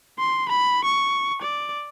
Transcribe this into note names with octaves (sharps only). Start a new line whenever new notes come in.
C6
B5
C#6
D5